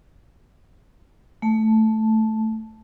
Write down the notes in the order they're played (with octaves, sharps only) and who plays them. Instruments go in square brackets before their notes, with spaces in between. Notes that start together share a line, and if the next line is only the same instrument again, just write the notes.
[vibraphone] A3 A5